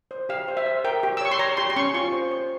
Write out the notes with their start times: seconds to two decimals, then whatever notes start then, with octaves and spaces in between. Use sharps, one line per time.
0.11 C5
0.29 G4 F5
0.48 C5
0.57 E5
0.66 C5
0.84 A#4 G5
1.03 G4
1.17 E6
1.21 C#5 C#6
1.31 C6
1.39 C#5 A#5
1.57 G4 C6
1.70 C6
1.76 C#4 C#6
1.94 F4 C#6
2.12 C5
2.31 C5